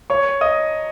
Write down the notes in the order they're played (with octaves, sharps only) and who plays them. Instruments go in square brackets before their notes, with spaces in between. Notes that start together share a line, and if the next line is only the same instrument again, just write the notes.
[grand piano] C#5 C#6
D#5 D#6